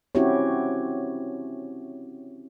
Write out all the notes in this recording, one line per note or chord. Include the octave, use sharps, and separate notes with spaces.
C4 C#4 E4 F#4 G4 C#5